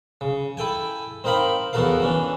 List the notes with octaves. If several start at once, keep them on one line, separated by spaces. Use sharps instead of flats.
C#3
E4 A4 G5 G#5
C4 D#4 A#4 F5 B5
E2 B3 F#4 A4 A#4 F5
E3 C#4 D4